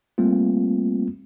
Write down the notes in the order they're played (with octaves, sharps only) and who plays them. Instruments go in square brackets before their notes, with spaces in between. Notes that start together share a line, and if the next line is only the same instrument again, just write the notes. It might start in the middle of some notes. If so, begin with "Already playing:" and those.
[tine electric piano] G3 A3 A#3 C4 F4